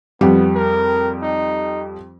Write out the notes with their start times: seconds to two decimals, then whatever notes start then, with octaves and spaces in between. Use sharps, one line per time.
0.21 F2 G3 B3
0.55 A#4
1.22 D#4